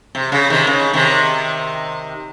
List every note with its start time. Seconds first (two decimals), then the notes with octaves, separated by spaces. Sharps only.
0.15 C3
0.32 C#3
0.50 C3 D#3
0.67 C#3
0.93 C3 D#3